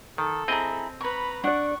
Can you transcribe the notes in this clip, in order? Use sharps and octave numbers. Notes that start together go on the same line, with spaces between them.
D#3 A4
C4 E4 G#4 D#5 A#5
B4 A#5 B5 C#6
D4 D5 F#5 C#6